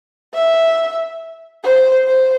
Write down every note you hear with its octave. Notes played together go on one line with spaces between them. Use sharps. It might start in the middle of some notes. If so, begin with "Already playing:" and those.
E5
C5
C5